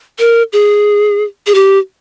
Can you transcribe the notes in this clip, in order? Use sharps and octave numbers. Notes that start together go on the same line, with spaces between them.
A#4
G#4
G#4
G4